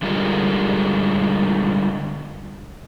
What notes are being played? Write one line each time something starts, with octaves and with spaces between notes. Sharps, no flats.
D3 G3 G#3 F4 A#4